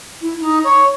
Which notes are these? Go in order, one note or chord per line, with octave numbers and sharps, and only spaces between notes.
E4
D#4
C#5